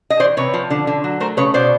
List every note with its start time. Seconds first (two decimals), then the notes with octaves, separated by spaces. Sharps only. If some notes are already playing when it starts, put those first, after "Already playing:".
0.10 D#5
0.20 E3 C5 D5
0.37 C3 B4 C#5
0.54 F3
0.70 D3
0.87 D3
1.04 F#3
1.20 A3 A#4 C5
1.37 C#3 B4 C#5
1.54 B2 C5 D5